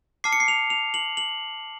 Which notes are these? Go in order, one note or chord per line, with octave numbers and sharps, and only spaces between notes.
A5 D6 F6 C7
C#7
C7
F7
F7
F#7
F#7